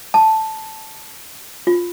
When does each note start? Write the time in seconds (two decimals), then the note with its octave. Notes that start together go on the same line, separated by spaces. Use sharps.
0.14 A5
1.67 F4